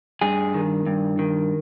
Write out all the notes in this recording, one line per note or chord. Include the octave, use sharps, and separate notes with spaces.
G2 G#4
D#3
G2
D#3